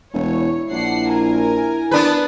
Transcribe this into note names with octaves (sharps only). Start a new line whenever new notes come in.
E1 E4 C#5
A#1 D4 F#5 C7
A#4 G#5
B3 D4 B4